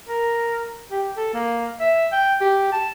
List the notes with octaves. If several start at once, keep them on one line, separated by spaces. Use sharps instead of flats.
A#4
G4
A4
A#3
E5
G5
G4
A5